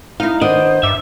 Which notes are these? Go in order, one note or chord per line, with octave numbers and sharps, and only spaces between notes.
D#4 E4 F5
D#3 B3 D4 C5 D#5
G2 E5 D6